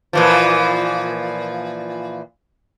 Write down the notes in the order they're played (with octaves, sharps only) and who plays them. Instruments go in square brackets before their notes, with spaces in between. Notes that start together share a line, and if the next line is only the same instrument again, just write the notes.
[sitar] A#2 E3 F3